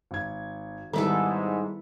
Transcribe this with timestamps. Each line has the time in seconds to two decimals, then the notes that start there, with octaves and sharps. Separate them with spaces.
0.11 G#1 G#6
0.93 G#2 D#3 G3 B3 D#4 E4 A4